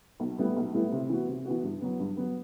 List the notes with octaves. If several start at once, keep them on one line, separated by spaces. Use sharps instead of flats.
B1
A2 G3 B3 E4
B1
A2 G3 B3 E4
C3
E3 B3 F#4
C3
E3 B3 F#4
G2
F#3 B3
G2
F#3 B3